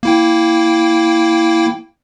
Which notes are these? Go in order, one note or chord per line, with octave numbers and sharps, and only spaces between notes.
A#3 E4 G5